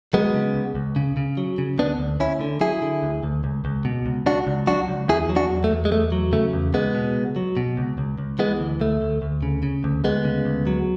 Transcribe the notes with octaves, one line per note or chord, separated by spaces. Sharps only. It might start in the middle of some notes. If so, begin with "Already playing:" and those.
F#3 G#3 B3
C#3
C#2
C#2
C#3
C#3
F#3
C#3
D2 B3 D4
D2
D2 C#4 E4
D3
F#3 E4 G#4
D3
D2
D2
C#2
C#2
B2
C#2
C#2 D4 F#4
C#2
F#3 D4 F#4
C#2
E2 E4 G#4
F#3
D4 F#4
E2
A3
E2
G#3
E2 A3
F#3
C#3 A3
E2
C#2 G#3 B3
B2
C#2
F#3
B2
C#2
C#2
C#2
E3 G#3 B3
D2
D2 A3
D2
D2
C#3
C#3
D2
D2 G#3 B3
C#3
D2
F#3